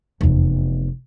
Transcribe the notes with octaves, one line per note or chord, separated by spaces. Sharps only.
F1 E2